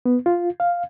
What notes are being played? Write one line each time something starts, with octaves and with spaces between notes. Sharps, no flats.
B3
F4
F5